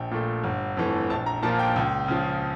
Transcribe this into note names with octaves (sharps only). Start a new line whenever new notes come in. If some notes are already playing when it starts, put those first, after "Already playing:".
Already playing: A#1 G5
A#2 A3
G1
F2 E3 A3
A#1 A5
A#5
A#2 F3 A#3 A5
G5
C#2
C#3 F3